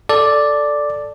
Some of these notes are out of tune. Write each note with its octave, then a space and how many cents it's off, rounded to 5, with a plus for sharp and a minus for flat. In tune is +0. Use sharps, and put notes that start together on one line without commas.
A4 +0 D5 +0